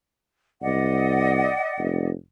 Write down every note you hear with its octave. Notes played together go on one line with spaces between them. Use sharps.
C2 D5 D#5 F#5
F1